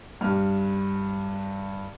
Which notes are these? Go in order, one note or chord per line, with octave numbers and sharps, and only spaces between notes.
G2 F6